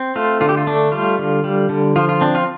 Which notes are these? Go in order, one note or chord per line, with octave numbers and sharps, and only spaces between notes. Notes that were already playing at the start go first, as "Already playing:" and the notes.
Already playing: C4
A3 F4
D3 F4
G4
F4
A3 D4
G3 F4
D3
G3
D3
F3 F4
F4
C4 D4
F4